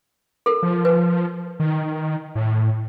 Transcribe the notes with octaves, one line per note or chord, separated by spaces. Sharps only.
A4 A#4
F3
B4
D#3
A2